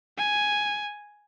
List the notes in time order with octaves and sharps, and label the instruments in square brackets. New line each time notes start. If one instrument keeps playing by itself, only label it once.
[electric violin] G#5